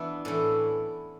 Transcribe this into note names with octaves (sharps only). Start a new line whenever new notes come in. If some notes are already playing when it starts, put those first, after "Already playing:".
Already playing: E3 B3 D4
A2 E3 C#4 E4